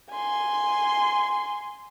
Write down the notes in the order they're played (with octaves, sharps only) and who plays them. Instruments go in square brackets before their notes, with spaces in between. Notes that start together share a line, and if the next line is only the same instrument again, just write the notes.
[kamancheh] G#5 C6